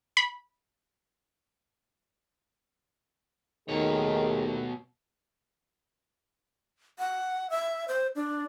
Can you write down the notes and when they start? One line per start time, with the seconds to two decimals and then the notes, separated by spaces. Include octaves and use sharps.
0.17 B5
3.69 D#2 B2 D#3 A3 G4 G#4 C#5
6.99 F#5
7.50 E5
7.88 C5
8.15 D4